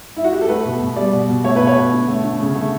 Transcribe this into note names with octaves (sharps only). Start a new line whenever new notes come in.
E4
F#4
G4
A4
A3 B4
B2
B2
G3 D5
B2
B2
A3 C#5
B2 B4
C#5
B2
D3
A3
D3
C#3
A3